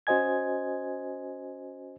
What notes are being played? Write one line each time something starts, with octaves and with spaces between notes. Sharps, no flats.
C#4 F#4 C5 D#5 G#5 G#6